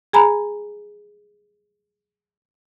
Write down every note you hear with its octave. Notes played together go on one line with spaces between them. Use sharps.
G#4 G#5 A#5 B5